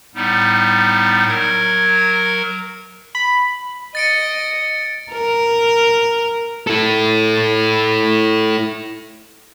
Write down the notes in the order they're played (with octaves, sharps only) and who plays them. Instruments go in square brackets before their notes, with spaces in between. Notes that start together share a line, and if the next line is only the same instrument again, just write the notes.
[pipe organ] A2 G3 B3 D#4
F#3 A#4 G#6
[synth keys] B5
[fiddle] D#5 [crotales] A6 C#7 D7
[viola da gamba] A#4
[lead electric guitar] E4 A4